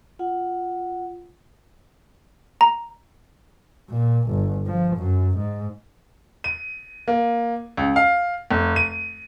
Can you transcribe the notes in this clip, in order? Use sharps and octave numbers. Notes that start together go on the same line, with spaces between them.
F4 F#5
A#5
A#2
G1
F3
F#2
G#2
D#7
A#3
C#2
F5
F1
D#7